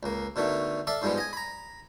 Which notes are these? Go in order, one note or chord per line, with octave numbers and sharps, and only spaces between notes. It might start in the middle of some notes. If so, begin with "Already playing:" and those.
C#2 A#3
B2 D3 D#3 A3
A4 D5 E5 F5
G#2 F3 G3 G#3 B3
D#5 G#5
A#5 B5